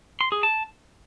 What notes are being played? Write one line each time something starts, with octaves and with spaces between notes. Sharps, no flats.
C6
G#4
A5